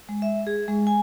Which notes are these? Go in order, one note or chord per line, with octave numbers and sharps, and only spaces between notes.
G#3
E5
G#4
G#3
G#5